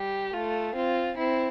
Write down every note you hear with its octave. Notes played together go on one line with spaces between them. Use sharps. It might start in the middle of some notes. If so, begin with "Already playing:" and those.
Already playing: G3 G4
A3 F4
C4 F4
C4 E4